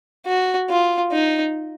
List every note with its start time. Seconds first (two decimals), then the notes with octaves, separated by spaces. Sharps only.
0.27 F#4
0.70 F4
1.12 D#4